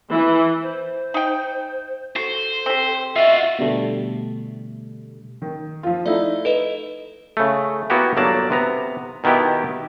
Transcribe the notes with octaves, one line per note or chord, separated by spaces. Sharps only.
E3
C5
D#4 G5
F#4 A4 C5
C4 G4
F4 F#4 D#5 E5
B2 D3 G3 A3
D#3
F3 F4
A3 D#4 E4 D5 E5
A4 B4 D#5
C#3 A3
A#3 B3 E4 F#4 G4
G1 F#3 A#3 D5 A5
C3 B3 A#5
B2 D#3 B3 E4 G4